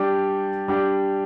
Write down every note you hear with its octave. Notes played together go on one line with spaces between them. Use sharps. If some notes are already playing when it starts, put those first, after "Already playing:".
Already playing: G3 D4 G4 D5
G3 D4 G4 D5